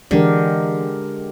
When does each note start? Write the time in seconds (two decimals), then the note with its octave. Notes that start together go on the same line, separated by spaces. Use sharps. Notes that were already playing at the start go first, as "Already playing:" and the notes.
0.11 D3 E3 G#3 D4 G4 A#4